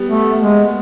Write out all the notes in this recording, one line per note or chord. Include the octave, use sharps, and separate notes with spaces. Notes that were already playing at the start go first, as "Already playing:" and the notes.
Already playing: G3 B3
A3
G#3